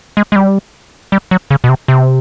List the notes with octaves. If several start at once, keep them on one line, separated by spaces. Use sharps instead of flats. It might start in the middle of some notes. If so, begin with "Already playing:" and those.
G#3
G#3
G3
G3
F#3
C#3
B2
C3
C3